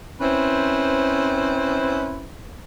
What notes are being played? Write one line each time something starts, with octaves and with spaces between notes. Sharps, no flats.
C4 C#4 E4 B4 C5